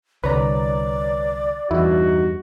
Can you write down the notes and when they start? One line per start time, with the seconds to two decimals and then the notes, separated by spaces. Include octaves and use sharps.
0.24 C2 D3 B4 C#5 D5 A#5
1.71 E2 G2 D#4 E4 F#4